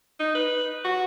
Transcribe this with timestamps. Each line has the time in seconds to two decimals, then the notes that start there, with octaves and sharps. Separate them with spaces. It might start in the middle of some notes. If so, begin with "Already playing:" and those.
0.19 D#4
0.35 B4
0.84 F#4